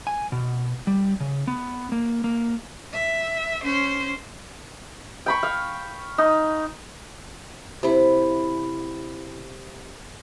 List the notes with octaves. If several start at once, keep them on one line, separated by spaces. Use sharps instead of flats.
G#5
B2
G3
C#3
B3
A#3
A#3
E5
C#4 C5
G5 B5 C#6
F5
D#4
C3 E4